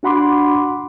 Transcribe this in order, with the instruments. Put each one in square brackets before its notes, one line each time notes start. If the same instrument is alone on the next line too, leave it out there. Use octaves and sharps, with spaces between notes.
[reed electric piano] D4 F#4 F#5 B5 C6 D6